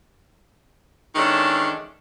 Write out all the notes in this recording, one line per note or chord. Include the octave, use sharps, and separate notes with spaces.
D#3 E3 G#3 C#4 D4 A4